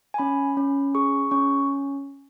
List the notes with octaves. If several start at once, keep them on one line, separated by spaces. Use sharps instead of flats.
G#5
C#4 B5
C#4
G#4 C#6
C#4 C#6